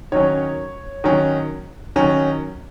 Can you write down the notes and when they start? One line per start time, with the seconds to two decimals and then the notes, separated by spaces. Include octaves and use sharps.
0.12 D#3 F#3 C#4 C#5
1.04 D#3 F#3 C#4
1.96 D#3 F#3 C#4